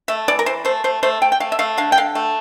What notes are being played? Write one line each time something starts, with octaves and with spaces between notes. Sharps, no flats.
A3 E5
E3 D5
A#4
E3 C5
A3 C5
A3 C5
A3 C5
A3 G5
G5
A3 F5
E5
A3 F5
D3 F5
G5
D3 F5
A3